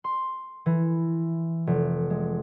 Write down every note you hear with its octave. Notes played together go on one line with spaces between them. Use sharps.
C6
E3
F1
G#3